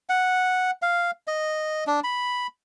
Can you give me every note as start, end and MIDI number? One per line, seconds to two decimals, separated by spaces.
0.09 0.71 78
0.82 1.11 77
1.27 1.84 75
1.87 2.00 62
2.04 2.47 83